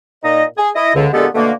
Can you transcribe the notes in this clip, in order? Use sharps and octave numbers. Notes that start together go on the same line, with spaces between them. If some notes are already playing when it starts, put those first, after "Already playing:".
A#2 D#4 D#5
G#4
E4 D#5
C#2 D3
A#2 D3 G#3 B3 G4 A4
B2 D3 A3 A#3